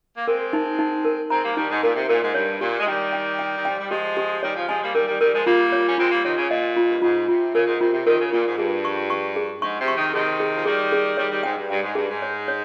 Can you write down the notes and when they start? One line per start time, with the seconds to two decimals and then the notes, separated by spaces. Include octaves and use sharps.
0.17 A#3
0.27 G#3 C4 A#4
0.53 D#4
0.79 D#4
1.05 A#4
1.30 G#3 C4 A#5
1.44 G3 A#3
1.50 G#3
1.57 D#3 G3 D#4
1.70 G#2
1.83 A#2 A#4
1.96 C3
2.09 A#2 A#4
2.22 G#2
2.35 G2 C#5
2.61 A#2 G4
2.80 G#3
2.86 D#3 G3 G5
3.13 G5
3.39 G5
3.58 D#3
3.65 F3 G5
3.79 G3
3.90 F3 G#3 G4
4.17 G4
4.43 D#3 G3 C#5
4.56 C#3 F3
4.69 F3 G#3 G#5
4.82 G3 A#3
4.95 D#3 G3 A#4
5.08 D#3 G3
5.20 D#3 G3 A#4
5.34 F3 G#3
5.46 G3 A#3 F4
5.72 C#5
5.88 C#4
5.98 G#3 C4 F4
6.11 G3 A#3
6.24 C3 D#3 C#5
6.37 C#3
6.50 A#2 D#5
6.76 F4
6.90 G2
7.02 G#2 F4
7.28 C3 F4
7.54 C#3 A#4
7.67 G#2
7.80 C3 F4
7.93 C3
8.06 C3 D#3 A#4
8.20 C#3
8.32 A#2 F4
8.45 G#2
8.58 G2 G#4
8.85 C#6
9.10 C#6
9.36 G#4
9.62 G#2 C#6
9.80 C3
9.88 C#6
9.97 C3 D#3
10.14 C3 D#3 G#4
10.40 G#4
10.54 F3
10.65 D#3 G3 G#4
10.92 G#4
11.17 D#3 G3 C#5
11.30 D#3 G3
11.43 G#2 G5
11.57 G2
11.70 G2 G5
11.82 G#2
11.95 G2 G#4
12.09 G#2
12.22 C#5
12.48 C#5